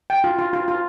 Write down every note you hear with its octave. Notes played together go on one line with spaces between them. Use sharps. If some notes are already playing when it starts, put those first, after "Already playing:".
G5
F4
F4
F4
F4